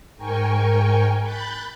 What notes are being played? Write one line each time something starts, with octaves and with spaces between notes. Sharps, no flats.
G#2 A#4 G5 G#5 C#6
B5 F#6 G6 A6